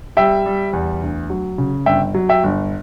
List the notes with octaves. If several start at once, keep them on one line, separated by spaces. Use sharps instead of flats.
G3 E5 G5
G3
E2
D2
F#3
C#3
G1 E5 G5
F#3
E5 G5
G1